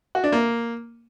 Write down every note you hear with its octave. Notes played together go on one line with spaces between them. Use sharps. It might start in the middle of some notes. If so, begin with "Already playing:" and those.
F#4
D4
A#3